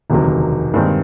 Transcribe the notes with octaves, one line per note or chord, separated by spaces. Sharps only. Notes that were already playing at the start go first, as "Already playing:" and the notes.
E1 D2 C3 D#3 F#3
G2 D#3 G#3 C4